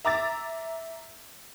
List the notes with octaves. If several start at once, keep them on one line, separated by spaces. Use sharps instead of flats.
E5 A#5 D6 E6 A6